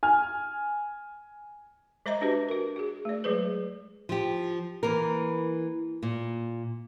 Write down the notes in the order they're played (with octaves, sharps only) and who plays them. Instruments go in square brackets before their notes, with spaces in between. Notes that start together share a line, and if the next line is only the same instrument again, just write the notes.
[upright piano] G#5 F6
[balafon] G#3 C5 D#5 E5 A#5 D6
D4 F#4 G4 B4
F#4 A#4
F#4 G#4
A3 D5
F#3 G#3 G#4 B4 C5
[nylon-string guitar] F3 G4
E3 A#3 A#4
A#2